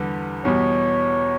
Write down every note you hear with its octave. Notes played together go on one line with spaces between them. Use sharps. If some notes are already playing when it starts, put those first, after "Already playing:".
Already playing: E2 D3 G3 B3
E2 B2 G3 C#5